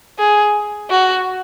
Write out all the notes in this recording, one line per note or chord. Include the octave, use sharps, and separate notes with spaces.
G#4
F#4